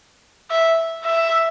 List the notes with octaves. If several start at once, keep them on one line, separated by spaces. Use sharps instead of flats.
E5
E5